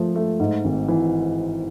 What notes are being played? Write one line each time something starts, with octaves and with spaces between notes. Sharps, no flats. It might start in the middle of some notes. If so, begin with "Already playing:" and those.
Already playing: F3 A3
A3
G#2
G#1
E3